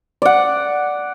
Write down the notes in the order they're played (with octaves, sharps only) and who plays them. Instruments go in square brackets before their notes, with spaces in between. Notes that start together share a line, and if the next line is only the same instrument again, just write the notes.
[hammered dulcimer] D5 F#5